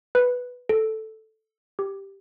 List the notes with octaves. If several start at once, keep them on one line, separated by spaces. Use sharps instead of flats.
B4
A4
G4